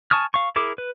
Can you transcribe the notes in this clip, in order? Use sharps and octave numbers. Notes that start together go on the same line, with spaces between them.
G#5 A5 C#6 D#6 F6
F5 C#6
E4 G#4 A#4 D6
B4